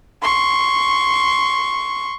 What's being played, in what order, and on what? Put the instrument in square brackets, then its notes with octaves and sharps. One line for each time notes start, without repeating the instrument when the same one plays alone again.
[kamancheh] C6 C#6